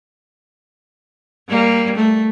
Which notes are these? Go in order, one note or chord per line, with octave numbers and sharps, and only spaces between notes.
G3 A#3
A3